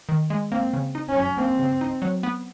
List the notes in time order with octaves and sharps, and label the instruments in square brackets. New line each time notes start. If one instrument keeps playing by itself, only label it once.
[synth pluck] D#3
G#3
[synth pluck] A#3 [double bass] C4
[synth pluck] C#3
D#4
[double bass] C#4
[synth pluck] F#3
[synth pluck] A#3 [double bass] C4
[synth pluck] C#3
D#4
F#3
B3